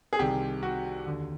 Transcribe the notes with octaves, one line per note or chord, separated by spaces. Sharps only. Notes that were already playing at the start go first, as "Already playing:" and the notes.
G#4
C2 C3 D#3 G4
F#4
D#2 D3